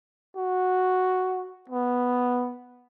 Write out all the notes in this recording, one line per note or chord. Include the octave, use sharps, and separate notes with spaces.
F#4
B3